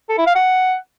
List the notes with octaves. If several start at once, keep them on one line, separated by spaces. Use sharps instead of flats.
A4
E4
F5
F#5